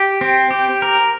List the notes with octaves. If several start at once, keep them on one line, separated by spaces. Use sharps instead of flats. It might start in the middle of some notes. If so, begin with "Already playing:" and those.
Already playing: G4
C4
G4
A#4